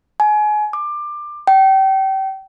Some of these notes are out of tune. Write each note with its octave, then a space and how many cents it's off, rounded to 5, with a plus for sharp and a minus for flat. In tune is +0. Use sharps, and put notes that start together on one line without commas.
G#5 +30
D6 +20
G5 -30